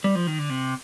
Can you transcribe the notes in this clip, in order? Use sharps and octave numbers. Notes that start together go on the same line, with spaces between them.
G3
F3
D#3
D3
C3